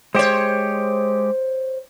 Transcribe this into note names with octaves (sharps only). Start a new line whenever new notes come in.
G#3 G4 C5 C#5